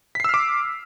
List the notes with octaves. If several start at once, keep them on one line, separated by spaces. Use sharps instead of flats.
D6 E6 F6 B6 C7